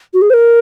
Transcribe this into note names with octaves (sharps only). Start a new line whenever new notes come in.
F#4
G#4
C5
A#4